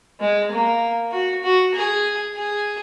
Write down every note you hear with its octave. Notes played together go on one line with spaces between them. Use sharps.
G#3
A#3
F#4
F#4
G#4
G#4